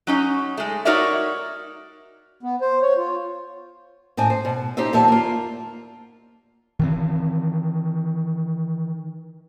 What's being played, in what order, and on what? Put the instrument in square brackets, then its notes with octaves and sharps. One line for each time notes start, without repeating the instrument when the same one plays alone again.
[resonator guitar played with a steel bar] F#3 C#4 D#4
G#3 A3
D#4 F#4 A#4 C#5 D5 E5
[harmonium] B3
C5
C#5
F4
[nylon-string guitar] A2 C4 D#5 G#5
C5
B2
D#4 G4 C5 D#5 E5
D#2 A#2 F3 B3 E5 A5
A#3 F4
[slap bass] D#3 E3 C4